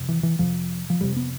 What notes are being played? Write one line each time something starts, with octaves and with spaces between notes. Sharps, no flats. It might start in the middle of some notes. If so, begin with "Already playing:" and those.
Already playing: F2 C3
E3
E3
F2 C3 F3
F3
F2 C3 G3
B3